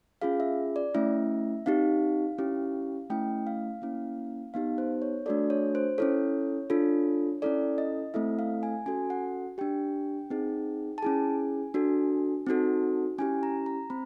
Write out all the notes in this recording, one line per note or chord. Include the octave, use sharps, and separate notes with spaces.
C#4 F4 G#4 F5
E5
D5
A3 C#4 E4 E5
C4 D#4 G4 F5
C#4 E4 G4
A3 C#4 E4 G5
F5
A#3 C#4 E4
B3 D#4 G4 F5
C5
C#5
A3 D4 F#4 A4 D5
C#5
C5
C#4 E4 A4 C#5
D4 F4 A4
C#4 E4 A4 D5
D#5
A3 C4 E4 A4 E5
F5
G#5
C#4 F#4 A4 G#5
F#5
D4 G4 G5
C4 D#4 G#4
A5
C#4 E4 G#4 G#5
D4 F#4 A4
C4 D#4 F#4 A4
C#4 E4 G4 G#5
A#5
A#5
C4 B5